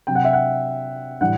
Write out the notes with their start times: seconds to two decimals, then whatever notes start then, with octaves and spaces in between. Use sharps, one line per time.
0.07 C3 F#3 G5
0.15 F#5
0.25 E5
0.33 F#5
1.21 A2 E3 G3 F#5